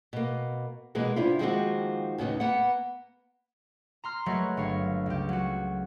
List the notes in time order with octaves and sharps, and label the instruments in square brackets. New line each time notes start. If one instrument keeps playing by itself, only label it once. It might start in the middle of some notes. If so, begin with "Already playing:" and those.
[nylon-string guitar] B2 A#3
B2 E3 G#3 A#3
C3 D4 E4 F4
D#3 F3 G#3 A#3 C4 F#4
D#2 A2 C#3 A#3 B3 D#4
A#3 B3 B4 F#5
[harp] A#5 C6 F6
F#3 G#3 A3 A#4 B4 C#5
G1 C#5 F5
C#2 G4
F#3 F#4